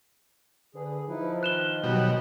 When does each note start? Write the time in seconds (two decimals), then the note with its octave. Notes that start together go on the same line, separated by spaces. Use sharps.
0.75 D3 G#4 B4
1.08 F3 D#4 E4 B4
1.43 D#3 F#6 E7 G7
1.83 B2 F#3 G3 F#4